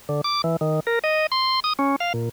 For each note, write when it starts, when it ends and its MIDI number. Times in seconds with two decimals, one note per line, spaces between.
0.09 0.21 50
0.24 0.42 86
0.44 0.56 52
0.61 0.80 51
0.87 0.99 70
1.04 1.27 75
1.32 1.60 84
1.64 1.73 87
1.79 1.96 61
2.00 2.13 77
2.14 2.29 46